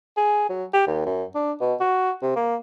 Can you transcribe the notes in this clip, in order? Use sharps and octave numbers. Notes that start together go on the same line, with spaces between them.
G#4
F#3
G4
D#2
F#2
D4
B2
F#4
C3
A#3